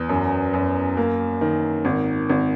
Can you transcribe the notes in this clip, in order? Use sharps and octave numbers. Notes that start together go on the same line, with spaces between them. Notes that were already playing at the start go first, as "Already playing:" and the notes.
Already playing: E2
F#2
F#2
A#3
D#3
G#1
G#1